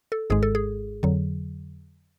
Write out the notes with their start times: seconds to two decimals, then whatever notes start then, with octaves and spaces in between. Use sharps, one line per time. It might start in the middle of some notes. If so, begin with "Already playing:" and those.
0.12 A4
0.30 G#1 G#2 G#3 G#4
0.43 A4
0.55 G#4
1.03 F2 D3 F#3